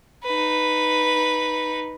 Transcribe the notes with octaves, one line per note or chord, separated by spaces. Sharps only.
D#4 B4